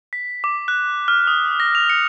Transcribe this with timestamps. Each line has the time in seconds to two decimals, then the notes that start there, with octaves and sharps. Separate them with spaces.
0.13 B6
0.44 D6
0.68 F#6
1.08 F6
1.27 D#6
1.60 A#6
1.75 F7
1.90 C#7